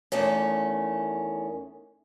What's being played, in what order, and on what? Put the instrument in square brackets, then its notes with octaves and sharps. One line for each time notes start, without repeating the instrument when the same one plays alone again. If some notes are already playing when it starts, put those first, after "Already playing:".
[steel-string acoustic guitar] E2 D#3 A3 C#4